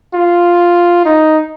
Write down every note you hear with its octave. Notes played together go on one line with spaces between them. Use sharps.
F4
D#4